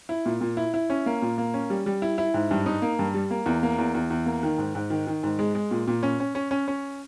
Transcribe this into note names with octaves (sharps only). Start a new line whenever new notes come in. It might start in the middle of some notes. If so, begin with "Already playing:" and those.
E4
A#2
A#2
E4
E4
C#4
A#3
A#2
A#3
C#4
G3
G3
E4
E4
G#2
G2
D#4
A#3
G2
G3
A#3
E2
A#3
E2
E2
E2
A#3
D#3
G#2
G#2
D#3
D#3
G#2
G#3
G#3
A#2
A#2
C#4
C#4
C#4
C#4
C#4